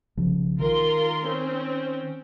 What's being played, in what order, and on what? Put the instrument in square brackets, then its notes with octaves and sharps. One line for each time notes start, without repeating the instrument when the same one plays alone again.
[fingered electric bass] B1 C#3 F3
[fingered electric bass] D#3 [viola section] F4 A#4 C6
[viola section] C4 C#4